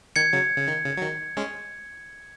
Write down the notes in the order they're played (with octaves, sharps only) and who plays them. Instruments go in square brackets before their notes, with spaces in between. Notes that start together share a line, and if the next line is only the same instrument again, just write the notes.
[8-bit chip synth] D#3 [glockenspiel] G#6 C#7
[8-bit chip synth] C#3 F#3
C#3
D#3
C#3
F#3
D#3
G#3 C#4